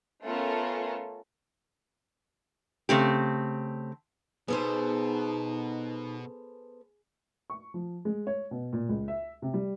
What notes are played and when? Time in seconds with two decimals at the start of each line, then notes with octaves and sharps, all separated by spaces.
0.24 A3 B3 C#4 F4 A4 A#4
2.89 C#3 A3 C4 G4
4.48 B2 B3 D#4 G#4 A4 C5
7.50 C#6
7.74 F3
8.05 G#3
8.27 C#5
8.51 B2
8.73 A#2
8.89 C#2
9.08 E5
9.42 C3
9.54 G3